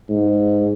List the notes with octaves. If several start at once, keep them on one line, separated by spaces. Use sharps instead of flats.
G#2